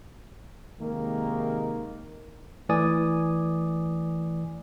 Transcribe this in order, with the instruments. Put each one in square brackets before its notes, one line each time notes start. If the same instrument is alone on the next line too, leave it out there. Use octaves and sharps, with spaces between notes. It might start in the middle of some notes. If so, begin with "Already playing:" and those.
[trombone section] C3 D#3 G#3 A#3
[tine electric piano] E3 A3 D5 G#5 D#6